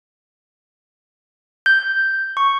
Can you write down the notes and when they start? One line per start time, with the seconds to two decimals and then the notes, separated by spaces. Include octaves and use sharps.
1.66 G6
2.37 C#6